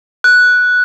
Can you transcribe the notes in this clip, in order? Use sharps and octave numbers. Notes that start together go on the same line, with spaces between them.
F#6